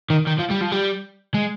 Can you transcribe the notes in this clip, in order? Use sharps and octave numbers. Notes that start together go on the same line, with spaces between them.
D#3
D#3
F3
G3
F3
G3
G#3